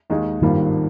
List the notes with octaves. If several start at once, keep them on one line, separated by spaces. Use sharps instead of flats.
D#2 D#3 G#3 D#4 G#4
G#1 G2 D#3 G3 A#3 F4